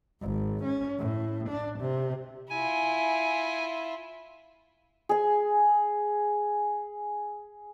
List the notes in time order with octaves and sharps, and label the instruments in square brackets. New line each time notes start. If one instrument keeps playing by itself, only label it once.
[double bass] G#1
C#4
A2
D4
C3
[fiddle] E4 F4 [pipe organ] G#5
[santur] G#4 G#5